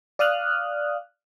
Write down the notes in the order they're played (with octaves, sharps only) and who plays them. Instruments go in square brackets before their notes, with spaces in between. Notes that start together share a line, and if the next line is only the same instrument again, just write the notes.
[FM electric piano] D5 F5 D#6 F6 F#6